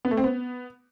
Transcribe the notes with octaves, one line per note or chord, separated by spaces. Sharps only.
B3
A3
C4
B3